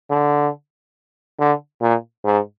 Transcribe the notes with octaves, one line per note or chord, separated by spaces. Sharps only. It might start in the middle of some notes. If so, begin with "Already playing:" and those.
D3
D3
A#2
G#2